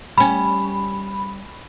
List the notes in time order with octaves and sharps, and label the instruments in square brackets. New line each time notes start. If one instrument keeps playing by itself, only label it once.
[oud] G3 C#4 [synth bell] B5